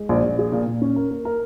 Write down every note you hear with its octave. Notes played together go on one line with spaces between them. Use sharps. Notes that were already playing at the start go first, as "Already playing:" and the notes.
Already playing: G#3
A#1
A#1
G#4
A#2
A#2
C#4
A#4
A#3
A#4